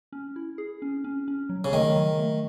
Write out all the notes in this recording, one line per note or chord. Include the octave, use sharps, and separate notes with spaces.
C#4
E4
G#4
C#4
C#4
C#4
F#3
C#3
D#3 A3
F#3
A3